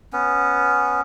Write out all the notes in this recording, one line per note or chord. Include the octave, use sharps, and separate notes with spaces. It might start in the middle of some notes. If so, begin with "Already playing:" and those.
B3 C#4